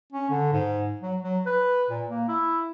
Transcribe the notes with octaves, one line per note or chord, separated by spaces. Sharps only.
C#4
D3
G#2
F#3
F#3
B4
A#2
A#3
E4